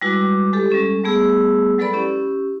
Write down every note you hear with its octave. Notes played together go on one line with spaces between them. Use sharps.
G3 G#3 E4 F#4 B4 D6
G#3 G4 A4
G3 G#3 C#4 A4
G3 A3 B3 G#4 E6
F#3 G#3 A4 B4 D5 B5
C#4 E4 G4